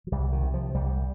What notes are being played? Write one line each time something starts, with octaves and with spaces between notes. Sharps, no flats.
F3
C2 G3
D#3
C3
F3
C2 G3